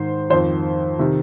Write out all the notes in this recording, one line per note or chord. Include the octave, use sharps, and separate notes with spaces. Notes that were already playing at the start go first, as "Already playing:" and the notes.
Already playing: G#2 D#3 C5
F2 D#3 C5
C3 D#3